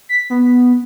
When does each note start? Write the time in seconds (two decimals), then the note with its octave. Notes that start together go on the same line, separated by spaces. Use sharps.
0.09 B6
0.30 B3